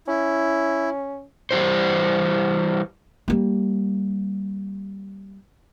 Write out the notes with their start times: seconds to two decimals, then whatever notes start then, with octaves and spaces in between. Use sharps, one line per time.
0.08 C#4 E4
1.51 E3 G3 C#4 E4 G4 C5
3.28 G3 A#3